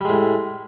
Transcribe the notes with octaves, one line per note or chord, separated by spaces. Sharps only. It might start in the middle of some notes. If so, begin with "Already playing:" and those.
A2 G3 G#3